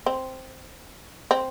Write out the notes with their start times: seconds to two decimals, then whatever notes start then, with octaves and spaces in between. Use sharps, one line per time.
0.06 C4
1.31 C4